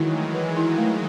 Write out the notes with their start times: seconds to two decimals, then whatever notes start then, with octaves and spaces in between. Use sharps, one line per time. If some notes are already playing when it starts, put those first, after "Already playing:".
Already playing: D#3 E3 F#3 G#3 E4
0.13 A3
0.35 B4
0.57 E4
0.78 A3